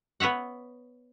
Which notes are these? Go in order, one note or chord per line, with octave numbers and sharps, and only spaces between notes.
B3 B4 C#5 E5 F#5